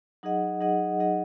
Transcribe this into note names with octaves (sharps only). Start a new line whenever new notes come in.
F#3 D#4 G#4 D#5 F#5
F#3 D#4 G#4 D#5 F#5
F#3 D#4 G#4 D#5 F#5